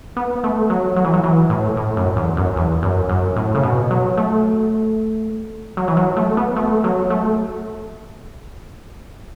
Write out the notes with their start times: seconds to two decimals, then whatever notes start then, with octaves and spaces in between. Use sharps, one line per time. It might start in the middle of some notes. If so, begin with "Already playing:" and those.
0.17 B3
0.44 A3
0.70 F#3
0.96 F#3
1.04 E3
1.14 F#3
1.24 E3
1.50 A2
1.77 A2
1.97 F#2
2.16 E2
2.37 F#2
2.56 E2
2.83 F#2
3.09 F#2
3.36 A2
3.55 C#3
3.63 B2
3.90 F#3
4.17 A3
5.77 F#3
5.88 E3
5.97 F#3
6.17 A3
6.37 B3
6.56 A3
6.84 F#3
7.10 A3